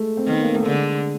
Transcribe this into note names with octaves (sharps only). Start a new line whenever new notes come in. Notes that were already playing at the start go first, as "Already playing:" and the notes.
Already playing: G#3 A3
C4
D#3 B3
A#3
A3
D3 G#3